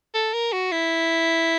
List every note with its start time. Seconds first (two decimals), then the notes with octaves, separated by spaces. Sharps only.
0.14 A4
0.33 A#4
0.52 F#4
0.72 E4